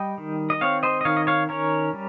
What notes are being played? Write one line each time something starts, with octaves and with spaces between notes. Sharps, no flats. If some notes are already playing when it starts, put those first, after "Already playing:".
Already playing: G3 D#5 G5
D#3
D#5
C4 C#5 F5
C5 D#5
D#5
D#3 C#5 F5
D#5
C#5 F5
C#4 A#4 C#5
G3